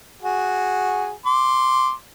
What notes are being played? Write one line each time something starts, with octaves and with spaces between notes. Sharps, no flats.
F#4 G#4
C6 D6